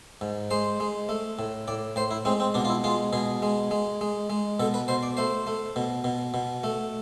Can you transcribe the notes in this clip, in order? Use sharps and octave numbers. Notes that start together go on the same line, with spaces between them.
G#2
G#3 C5
G#3
A3
A2
A2 D5
A2 C5
E4
G#3 C4
C4
B2 D4
F4
E4
G#3 F4
B2 G#4
G#3
G#3
G#3
G#3
B2 A4
B4
B2 C5
D5
A3 C5
A3
B2
B2
B2
A3